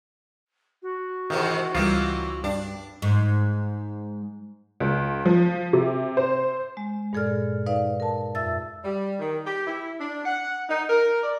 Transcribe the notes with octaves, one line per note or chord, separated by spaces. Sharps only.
F#4
G#2 C3 D#3 E3
C#2 E3 F#3 G3 A#3 C4 D#4 F4
G2 D4
G#2
C#2
F3
C3
C5
G#3
G2 A#2 G#4 A4 D5 F6
D#4 B4 D5 F5
A#4 A5
F2 E5 E6 A6
G3
D#3
G4
E4
D4
F#5
D#4
A#4
D5